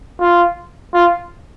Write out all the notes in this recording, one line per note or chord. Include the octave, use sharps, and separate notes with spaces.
F4
F4